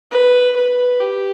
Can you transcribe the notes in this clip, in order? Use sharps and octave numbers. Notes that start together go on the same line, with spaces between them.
B4
B4
G4